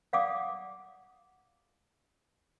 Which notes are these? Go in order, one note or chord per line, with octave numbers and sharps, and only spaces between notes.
D5 F5 F#5 D6 D#6